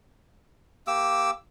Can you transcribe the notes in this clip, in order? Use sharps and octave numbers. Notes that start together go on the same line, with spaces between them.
A#3 G4 D6 E6